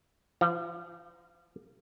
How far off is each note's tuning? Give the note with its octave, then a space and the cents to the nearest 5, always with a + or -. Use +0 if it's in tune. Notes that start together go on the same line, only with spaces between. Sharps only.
F3 -40 F4 +0 A#5 +0